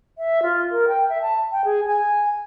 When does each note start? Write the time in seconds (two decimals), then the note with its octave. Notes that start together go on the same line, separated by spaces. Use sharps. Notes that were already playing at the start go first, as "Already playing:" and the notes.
0.18 E5
0.42 F4
0.71 A#4
0.88 G5
1.09 E5
1.22 A5
1.51 G5
1.64 G#4
1.86 G#5